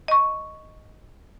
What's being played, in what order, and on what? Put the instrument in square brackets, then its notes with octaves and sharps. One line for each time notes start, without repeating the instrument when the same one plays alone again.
[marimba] D#5 C#6